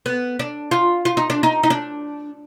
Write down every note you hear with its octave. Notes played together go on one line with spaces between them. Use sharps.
B3
D4
F4
F4
D#4
D4
D#4
D#4
D4